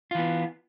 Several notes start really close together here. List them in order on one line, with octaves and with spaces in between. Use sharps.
F4 E3 B3